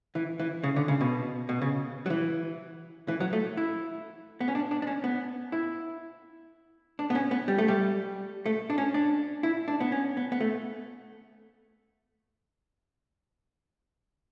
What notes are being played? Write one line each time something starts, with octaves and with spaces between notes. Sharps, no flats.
E3
E3
C#3
D3
C#3
B2
B2
C#3
F#3
E3
E3
F#3
A3
E4
B3
C#4
D4
D4
D4
C#4
B3
E4
D4
B3
C#4
B3
G3
A3
G3
A3
D4
C#4
D4
E4
D4
B3
C#4
B3
B3
A3